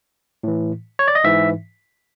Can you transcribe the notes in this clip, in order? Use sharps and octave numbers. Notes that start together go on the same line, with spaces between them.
A2 E3
C#5
D5
D#5
G#2 E3 E5